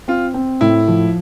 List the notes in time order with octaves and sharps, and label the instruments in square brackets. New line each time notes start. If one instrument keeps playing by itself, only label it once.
[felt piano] C4 [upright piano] F4
[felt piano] C4
[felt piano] A2 [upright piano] E4
[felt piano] F3